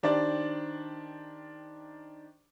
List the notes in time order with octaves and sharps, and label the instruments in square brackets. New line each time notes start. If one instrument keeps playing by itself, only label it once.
[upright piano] D#3 D4 G4 C5 D5